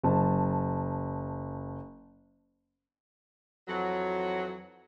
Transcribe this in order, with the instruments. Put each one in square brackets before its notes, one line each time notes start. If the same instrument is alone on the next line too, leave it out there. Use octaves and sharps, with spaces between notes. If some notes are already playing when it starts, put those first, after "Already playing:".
[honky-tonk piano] F#1 A5
[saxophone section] F2 E3 F#3